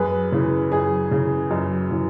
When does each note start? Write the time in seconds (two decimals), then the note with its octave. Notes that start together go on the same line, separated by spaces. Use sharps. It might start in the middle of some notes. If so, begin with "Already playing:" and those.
Already playing: F#2 G#4 B4
0.32 C#3 E3
0.72 F#2 G#4
1.11 C#3 E3
1.51 F#2
1.91 C#3 E3